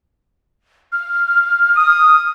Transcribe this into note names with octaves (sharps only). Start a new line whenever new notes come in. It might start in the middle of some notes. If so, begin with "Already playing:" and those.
F6
D#6